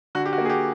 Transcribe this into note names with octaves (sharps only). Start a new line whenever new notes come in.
D3 F#4
G4
F#4
A#3
G#4
G4